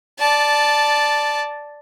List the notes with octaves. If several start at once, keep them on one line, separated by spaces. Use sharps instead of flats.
D5 A5